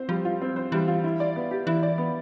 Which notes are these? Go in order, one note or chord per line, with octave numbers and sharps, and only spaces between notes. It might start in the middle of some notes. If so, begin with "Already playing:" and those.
Already playing: C4 C5
F3 G3
F4
C4
C5
E3 G3
F4
E4
D5
B3
G4
E3 E4
D5
B3